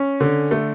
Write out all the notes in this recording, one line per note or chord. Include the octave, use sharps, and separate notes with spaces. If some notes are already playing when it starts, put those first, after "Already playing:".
Already playing: C#4
D3
A3